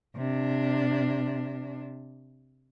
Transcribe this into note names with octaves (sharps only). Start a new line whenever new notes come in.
C3 D4